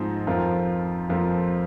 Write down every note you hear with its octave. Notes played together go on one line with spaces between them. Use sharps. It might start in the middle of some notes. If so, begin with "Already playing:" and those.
Already playing: G#2 F3 C4 D#4
F2 F3 C4 F4 A#4
F2 F3 C4 F4 A#4